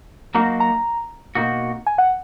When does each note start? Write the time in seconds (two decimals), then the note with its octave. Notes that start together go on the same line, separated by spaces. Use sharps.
0.35 F#3 A#3 D#4 F#4 A#5
0.60 A#5
1.35 B2 A#3 D#4 F#4
1.87 G#5
1.98 F#5